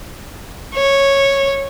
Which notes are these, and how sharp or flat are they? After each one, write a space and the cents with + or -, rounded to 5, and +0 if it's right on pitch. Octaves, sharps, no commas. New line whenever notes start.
C#5 -10